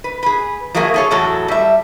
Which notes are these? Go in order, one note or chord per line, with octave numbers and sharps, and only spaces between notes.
B4
G#4 B4
F3 F#3 A3 A#3 G#4
G#4 A4 C#5
E2 A2 F#3 A4
G3 E5